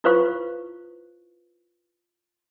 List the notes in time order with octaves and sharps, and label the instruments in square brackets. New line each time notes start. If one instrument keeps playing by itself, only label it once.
[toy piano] E4 F4 B4 C5 F5 C#6